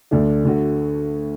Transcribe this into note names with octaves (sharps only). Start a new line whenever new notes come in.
D2 D3 A3 D4
D2 D3 A3 F#4